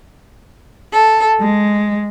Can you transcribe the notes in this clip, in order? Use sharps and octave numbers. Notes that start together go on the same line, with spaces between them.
A4
G#3